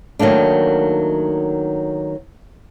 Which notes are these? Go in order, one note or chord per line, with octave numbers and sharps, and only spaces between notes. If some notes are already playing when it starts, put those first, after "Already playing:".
D#3 F#3 A3 A#3 D4